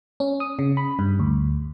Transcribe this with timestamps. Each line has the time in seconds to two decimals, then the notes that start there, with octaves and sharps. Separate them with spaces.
0.20 C#4
0.40 D#6
0.59 C#3
0.77 B5
0.99 G2
1.19 D2